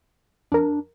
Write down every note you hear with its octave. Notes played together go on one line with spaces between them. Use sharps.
F2 D4 A#4